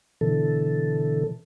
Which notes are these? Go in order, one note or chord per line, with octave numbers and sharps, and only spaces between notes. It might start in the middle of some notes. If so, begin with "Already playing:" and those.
B2 D3 E3 A4